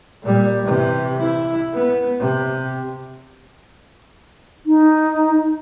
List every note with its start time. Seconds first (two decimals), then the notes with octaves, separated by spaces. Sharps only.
0.23 A#2 G3
0.64 C3 E3
1.20 E4
1.74 B3
2.20 C3
4.66 D#4